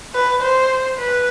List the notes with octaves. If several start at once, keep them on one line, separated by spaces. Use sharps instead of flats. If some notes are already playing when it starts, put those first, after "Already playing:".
B4
C5
B4